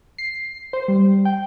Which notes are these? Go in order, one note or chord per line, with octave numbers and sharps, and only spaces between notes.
C7
C5
G3
G5